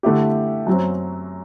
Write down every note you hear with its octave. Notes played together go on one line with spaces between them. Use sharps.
D3 A3 E4 G4
F#2 F#3 C4